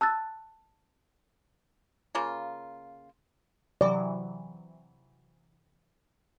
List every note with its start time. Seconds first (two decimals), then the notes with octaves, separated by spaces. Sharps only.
0.01 A5 E6 F#6 A6
2.15 C#3 A#3 F4
3.81 C3 E3 F#3 D5